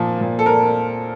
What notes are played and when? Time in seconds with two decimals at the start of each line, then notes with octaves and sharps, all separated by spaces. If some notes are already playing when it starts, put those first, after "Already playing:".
Already playing: A#2 F3
0.21 A#2
0.39 A4
0.46 A#4